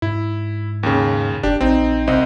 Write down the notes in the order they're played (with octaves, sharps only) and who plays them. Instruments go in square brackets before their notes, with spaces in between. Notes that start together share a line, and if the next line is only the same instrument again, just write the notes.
[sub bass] G#2 [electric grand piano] E4
[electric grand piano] D#2 C#3
[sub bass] F#1 [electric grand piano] D4 G4
[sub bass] A#1 [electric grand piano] C4 D#4
[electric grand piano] C2 C4 D#5